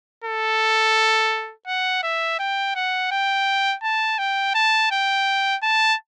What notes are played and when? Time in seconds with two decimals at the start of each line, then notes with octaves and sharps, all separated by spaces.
0.24 A4
1.67 F#5
2.03 E5
2.39 G5
2.75 F#5
3.12 G5
3.83 A5
4.19 G5
4.54 A5
4.92 G5
5.63 A5